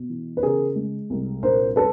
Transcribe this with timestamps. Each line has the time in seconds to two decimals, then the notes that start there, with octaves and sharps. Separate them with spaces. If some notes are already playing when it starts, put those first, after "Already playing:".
Already playing: B2
0.09 E3
0.37 B4
0.43 C#3 G#4 A#4
0.76 G#3
1.10 C2
1.42 A#1 A#4 C5
1.76 A4 B4